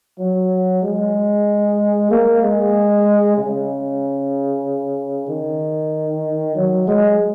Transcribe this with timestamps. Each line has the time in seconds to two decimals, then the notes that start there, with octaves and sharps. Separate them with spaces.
0.19 F#3
0.83 G#3
2.11 A#3
2.42 G#3
3.37 C#3
5.28 D#3
6.55 F#3
6.88 G#3